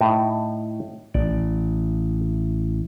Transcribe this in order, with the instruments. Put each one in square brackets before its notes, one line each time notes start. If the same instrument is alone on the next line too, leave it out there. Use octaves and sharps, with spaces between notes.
[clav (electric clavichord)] A2 D#4
[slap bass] A1 [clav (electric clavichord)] D5